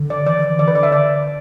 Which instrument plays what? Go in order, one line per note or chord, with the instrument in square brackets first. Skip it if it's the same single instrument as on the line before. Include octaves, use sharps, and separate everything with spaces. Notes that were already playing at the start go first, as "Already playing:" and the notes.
Already playing: [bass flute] D3
[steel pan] D5
[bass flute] E3 [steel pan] D5
[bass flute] E3
E3
[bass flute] D3 [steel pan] D5
[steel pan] B4
D5
E5
D5